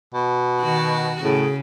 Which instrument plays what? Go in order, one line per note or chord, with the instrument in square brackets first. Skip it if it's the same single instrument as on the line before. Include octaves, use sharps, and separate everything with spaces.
[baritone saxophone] B2
[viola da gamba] D#3 F#4
[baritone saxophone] A2 [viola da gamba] C#3 [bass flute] G#4